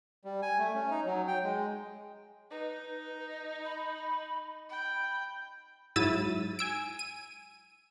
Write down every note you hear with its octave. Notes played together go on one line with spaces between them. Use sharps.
G3
G#5
A3
C#4
D#4
F#3
G5
G#3
D#4 B4
B5
G5 B5
G#2 F#3 E4 E6 A6 D#7
G#5 E6 D7
D#7